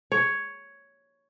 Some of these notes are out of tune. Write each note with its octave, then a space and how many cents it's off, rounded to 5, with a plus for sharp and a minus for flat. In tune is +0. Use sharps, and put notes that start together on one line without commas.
C#5 +5